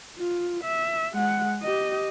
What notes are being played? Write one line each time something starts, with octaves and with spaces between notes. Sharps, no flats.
F4
E5
G#3 F#5
G4 D#5